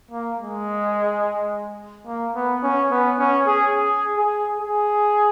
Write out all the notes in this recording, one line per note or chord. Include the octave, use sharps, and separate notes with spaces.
A#3
G#3
A#3
B3
C#4
B3
C#4
G#4
G#4
G#4
G#4